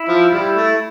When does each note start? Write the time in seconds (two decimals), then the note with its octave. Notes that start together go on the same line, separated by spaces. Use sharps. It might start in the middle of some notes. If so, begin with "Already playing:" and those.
Already playing: E4
0.08 F3
0.32 G3 E4
0.55 A3